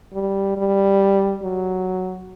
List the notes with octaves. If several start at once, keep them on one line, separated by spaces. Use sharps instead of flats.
G3
G3
F#3